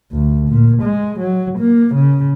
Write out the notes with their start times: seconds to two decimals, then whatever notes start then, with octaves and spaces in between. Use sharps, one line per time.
0.12 D2
0.50 A#2
0.83 G#3
1.20 F#3
1.59 A#3
1.95 C#3